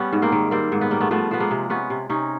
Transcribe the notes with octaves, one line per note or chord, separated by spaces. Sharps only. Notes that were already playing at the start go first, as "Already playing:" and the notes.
Already playing: G3 B3 C#4
G#2
A#3 C4
D#3
G3 A#3 C4
G#2
B3
G3 A#3
A3 B3
F3 A3 B3
F3 B3
G#3 A#3
C3
C3 B3 C#4
C3
C3 C#4 D#4